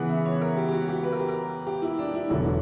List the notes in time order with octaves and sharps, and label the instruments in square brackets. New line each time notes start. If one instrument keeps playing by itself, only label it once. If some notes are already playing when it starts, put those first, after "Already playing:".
Already playing: [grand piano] C#3 E3 B3 [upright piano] B4 F#5
[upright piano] E5
C#5
A#4
G4
G4
F#4
G4
B4
A#4
G4
A#4
G4
E4
D4
E4
[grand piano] E1 E2 D3 F#3 [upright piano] E4